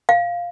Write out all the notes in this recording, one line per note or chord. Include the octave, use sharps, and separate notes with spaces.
F5